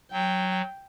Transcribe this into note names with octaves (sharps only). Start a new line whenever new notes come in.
F#3 G5